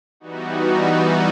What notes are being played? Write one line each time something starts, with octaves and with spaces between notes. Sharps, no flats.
E3 G3 B3 D#4 F#4